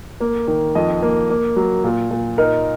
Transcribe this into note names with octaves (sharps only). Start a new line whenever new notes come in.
A#3
D#3
F2 D#5
A#3
A#3
F#3
A#2
A#2
D#4 A#4